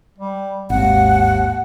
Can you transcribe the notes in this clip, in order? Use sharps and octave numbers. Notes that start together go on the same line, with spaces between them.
G3
G#1 D#2 F#5